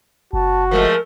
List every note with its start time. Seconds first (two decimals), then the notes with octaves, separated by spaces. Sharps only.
0.33 F#1 F#4 A5
0.71 F3 G#3 A3 A#4